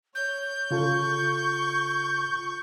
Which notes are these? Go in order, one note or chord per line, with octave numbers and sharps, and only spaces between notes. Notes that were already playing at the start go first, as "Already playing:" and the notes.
C#5 G6
C#3 F4 A4 C#6